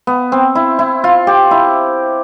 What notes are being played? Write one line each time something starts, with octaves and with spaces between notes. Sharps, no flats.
B3
C4
E4
E4
F4
G4
E4